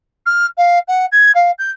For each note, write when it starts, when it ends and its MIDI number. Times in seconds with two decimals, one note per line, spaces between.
0.26 0.46 89
0.57 0.79 77
0.88 1.06 78
1.12 1.31 92
1.35 1.51 77
1.58 1.71 91